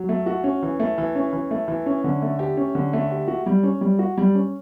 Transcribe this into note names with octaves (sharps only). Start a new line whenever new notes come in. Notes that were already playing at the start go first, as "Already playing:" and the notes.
Already playing: F#3
A3
F#4
C#4
E3
A3
E3
C#4
E3
A3
E3
C#4
D3
A3
G4
C#4
D3
A3
G4
F#4
G3
C#4
G3
F#4
G3
C#4